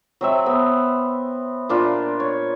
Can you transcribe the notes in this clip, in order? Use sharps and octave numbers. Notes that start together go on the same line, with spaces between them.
F#3 C4 E5
B3 C4
A#2 D4 F4 B5
C#5